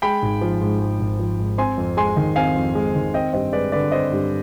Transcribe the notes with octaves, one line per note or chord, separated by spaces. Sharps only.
G#3 G5 B5
G#1
F3
G#2
G#3
G#1
F3
G#2
C4 G#5 C6
F2
G#3 G#5 C6
D#3
C4 F5 G#5
F2
G#3
D#3
C4 D#5 G5
G2 C5 D#5
G#3 B4 D5
D3 B4 D5
C4 C5 D#5
G2